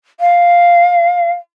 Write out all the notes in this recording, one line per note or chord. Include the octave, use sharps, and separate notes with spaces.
F5